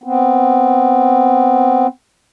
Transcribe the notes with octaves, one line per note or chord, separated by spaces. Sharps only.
B3 C4